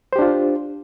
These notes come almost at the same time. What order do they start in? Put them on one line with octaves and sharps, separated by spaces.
C5 G4 D4 F4